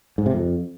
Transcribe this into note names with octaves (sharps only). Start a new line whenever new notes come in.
G#2
C3
F2